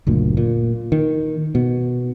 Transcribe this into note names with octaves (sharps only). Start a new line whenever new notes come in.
F#1 D2 A#2
A#2
D#3
B2